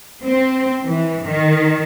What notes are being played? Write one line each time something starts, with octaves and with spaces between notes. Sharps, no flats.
C4
E3
D#3